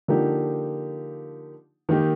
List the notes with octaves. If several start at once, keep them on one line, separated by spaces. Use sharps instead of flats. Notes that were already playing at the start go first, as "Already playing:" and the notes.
D3 F3 A#3 D#4 G4
D#3 A#3 D#4 G4